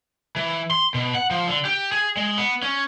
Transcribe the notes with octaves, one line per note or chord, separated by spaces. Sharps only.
E3
C6
B2
F#5
F3
D3
G4
G#4
G#3
B3
C#4